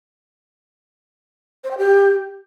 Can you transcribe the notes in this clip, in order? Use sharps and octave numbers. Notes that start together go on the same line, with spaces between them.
C5
G5
G4